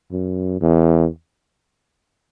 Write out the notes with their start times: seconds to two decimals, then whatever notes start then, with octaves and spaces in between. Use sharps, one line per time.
0.11 F#2
0.61 E2